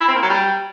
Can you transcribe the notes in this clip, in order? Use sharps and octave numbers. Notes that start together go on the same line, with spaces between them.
E4
C4
A#3
F#3
G3